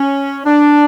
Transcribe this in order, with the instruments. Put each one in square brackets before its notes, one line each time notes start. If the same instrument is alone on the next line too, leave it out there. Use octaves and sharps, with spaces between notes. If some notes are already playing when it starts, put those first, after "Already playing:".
Already playing: [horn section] C#4
D4